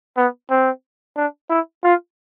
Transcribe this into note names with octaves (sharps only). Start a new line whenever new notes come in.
B3
C4
D4
E4
F4